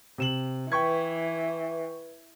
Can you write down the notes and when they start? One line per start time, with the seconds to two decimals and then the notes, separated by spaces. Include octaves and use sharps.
0.18 C3 E7 F#7
0.72 E3 B4 G5 C#6 G#6